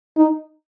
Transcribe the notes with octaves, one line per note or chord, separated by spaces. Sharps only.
D#4